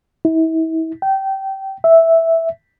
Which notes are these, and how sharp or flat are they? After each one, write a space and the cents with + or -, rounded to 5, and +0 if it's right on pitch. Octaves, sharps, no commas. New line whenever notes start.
E4 -35
G5 -20
E5 -5